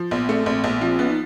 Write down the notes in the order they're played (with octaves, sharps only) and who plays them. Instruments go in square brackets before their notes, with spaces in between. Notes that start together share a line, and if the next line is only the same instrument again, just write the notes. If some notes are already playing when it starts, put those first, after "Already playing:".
Already playing: [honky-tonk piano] F3
[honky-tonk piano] A#1 [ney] B3
[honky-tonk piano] A3 [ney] C4
[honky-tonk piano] A#1 [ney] C4
[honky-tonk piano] A#1 [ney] B3
[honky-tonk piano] F3 [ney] C4
[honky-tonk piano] B3 [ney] C#4
[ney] D#4